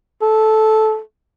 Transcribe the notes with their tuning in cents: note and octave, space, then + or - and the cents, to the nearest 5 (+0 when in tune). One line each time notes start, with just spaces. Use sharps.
A4 -10